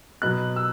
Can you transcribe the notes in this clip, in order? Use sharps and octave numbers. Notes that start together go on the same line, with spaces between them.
B2 F#3 B3 F#6
E6